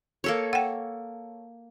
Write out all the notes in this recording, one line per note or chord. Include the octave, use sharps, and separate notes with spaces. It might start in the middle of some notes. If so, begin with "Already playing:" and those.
A#3 A4 C#5
F#5 G5